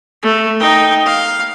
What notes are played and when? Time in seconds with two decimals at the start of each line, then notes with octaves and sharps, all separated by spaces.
0.23 A3
0.60 D#4 G5
1.06 F5